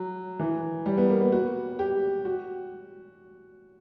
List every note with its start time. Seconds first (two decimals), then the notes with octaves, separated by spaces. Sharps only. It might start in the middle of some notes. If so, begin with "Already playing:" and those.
Already playing: F#3
0.39 E3
0.86 G3
0.97 B3
1.09 A#3
1.21 B3
1.32 F#4
1.79 G4
2.25 F#4